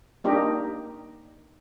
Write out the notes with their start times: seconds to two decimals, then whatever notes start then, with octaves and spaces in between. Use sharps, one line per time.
0.24 A#3 D4 D#4 G4 A#4